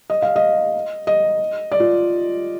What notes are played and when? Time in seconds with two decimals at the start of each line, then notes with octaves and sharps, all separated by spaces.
0.10 D#5
0.22 F5
0.36 D#5
1.07 D#5
1.72 D5
1.80 F4